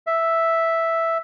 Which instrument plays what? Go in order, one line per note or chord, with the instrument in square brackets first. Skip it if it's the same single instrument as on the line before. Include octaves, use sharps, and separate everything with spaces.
[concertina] E5